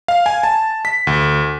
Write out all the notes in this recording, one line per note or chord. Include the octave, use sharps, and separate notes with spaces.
F5
G#5
A5
B6
D2